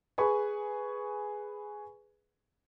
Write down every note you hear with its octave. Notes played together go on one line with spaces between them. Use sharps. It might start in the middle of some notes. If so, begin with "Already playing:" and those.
G#4 B4 G#5 B5 C#6